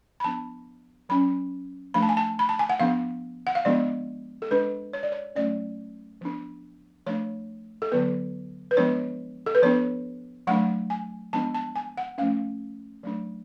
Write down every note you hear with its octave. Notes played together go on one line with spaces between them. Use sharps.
B5
F3 B3 D4 A5
F#3 C#4 B5
F3 A3 D4 B5
A5
G#5
A5
B5
A5
G#5
F#5
F3 B3 D4 F5
F#5
F5
F3 G#3 B3 D4 D5
A4
G#3 D4 B4
C#5
D5
C#5
F#3 A3 C#4 D5
F3 B3 D4
F3 A3 D4 C#5
A4
D3 F#3 B3 B4
B4
F3 G#3 B3 D4 C#5
A4
B4
F3 B3 D4 C#5
F#3 A3 D4 F#5
G#5
F3 G#3 B3 D4 A5
A5
G#5
F#5
F3 A3 C#4 F5
F#3 A3 D4